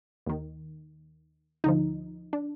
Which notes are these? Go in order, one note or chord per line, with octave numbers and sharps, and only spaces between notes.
D#2 D#3
D2 D3 F3 D#4
D4